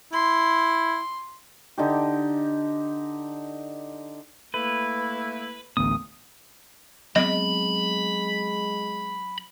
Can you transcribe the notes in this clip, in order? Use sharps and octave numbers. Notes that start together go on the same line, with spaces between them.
E4 C6
D3 D#4 G4
A3 A#3 E4 B4
A1 D2 B3 D#6
F#3 G#3 B3 C4 D#5 B5